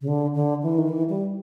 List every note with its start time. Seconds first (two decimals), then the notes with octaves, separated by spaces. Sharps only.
0.01 C#3
0.08 D3
0.35 D3
0.63 E3
0.78 D#3
0.89 E3
1.09 G3